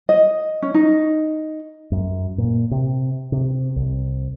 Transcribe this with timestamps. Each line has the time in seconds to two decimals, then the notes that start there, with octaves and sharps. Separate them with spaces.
0.09 D#5
0.62 C#4
0.74 D#4
1.92 F#2
2.38 A#2
2.71 C3
3.32 C3
3.76 C2